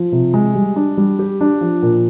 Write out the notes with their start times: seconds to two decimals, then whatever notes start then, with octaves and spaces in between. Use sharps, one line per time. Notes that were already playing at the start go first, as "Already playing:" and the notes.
Already playing: F3
0.12 C3
0.34 G#3
0.55 G3
0.76 D4
0.97 G3
1.19 G4
1.41 D4
1.61 F3
1.82 A#2